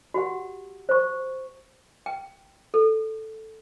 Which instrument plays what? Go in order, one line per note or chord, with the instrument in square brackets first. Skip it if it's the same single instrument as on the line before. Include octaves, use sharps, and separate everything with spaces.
[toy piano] F#4 G4 F#5
C5 C#6
G5
A4